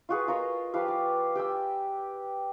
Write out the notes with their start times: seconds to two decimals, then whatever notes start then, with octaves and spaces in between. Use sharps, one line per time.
0.09 F4 F#4 G#4 B4
0.28 F4 A#4 C#5 D#5
0.74 F3 G4 B4 F5
0.88 D5
1.35 G4 G5 G#5 E6